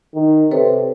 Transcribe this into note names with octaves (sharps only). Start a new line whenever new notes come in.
D#3
C3 A4 B4 C#5